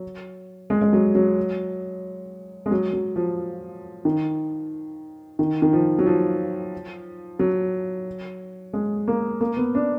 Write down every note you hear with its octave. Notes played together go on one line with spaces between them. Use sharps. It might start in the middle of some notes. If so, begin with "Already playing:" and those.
Already playing: F#3
G#3
G#3
F#3
F#3
G#3
F#3
F#3
F3
D#3
D#3
D#3
F3
F#3
F3
F#3
G#3
A#3
A#3
B3
D4